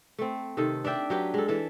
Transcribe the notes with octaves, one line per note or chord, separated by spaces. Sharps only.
A3 C4
C3 D#3 A4
D4 D5 E5 G5
F#3 G4 B4
G#3 A4
E3 A4 E5